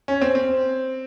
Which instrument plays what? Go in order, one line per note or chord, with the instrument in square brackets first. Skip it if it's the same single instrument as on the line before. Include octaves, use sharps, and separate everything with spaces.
[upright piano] C#4
C4
C4